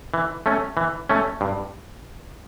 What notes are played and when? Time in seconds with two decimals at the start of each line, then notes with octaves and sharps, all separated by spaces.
0.14 E3
0.46 A3 C#4
0.77 E3
1.09 A3 C#4
1.41 G2